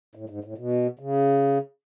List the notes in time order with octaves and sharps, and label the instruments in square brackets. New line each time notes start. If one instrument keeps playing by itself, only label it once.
[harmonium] A2
G#2
A2
B2
C#3